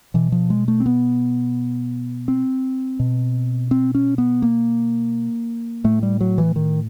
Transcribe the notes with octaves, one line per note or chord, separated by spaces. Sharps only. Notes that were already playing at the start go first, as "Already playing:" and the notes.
B2 E3
F3
G#3
A3
C4
B3
C4
B2
C4
C#4
B3
A#3
A2 A3
G3
F#3
E3
D#3